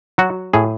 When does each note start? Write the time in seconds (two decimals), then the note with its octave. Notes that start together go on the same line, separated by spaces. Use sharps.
0.18 F#3 F#4
0.53 A2 G#4